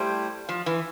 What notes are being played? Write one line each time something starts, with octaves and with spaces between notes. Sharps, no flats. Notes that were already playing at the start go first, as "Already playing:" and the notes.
Already playing: G3 A3 E4 G4 C5
F3
E3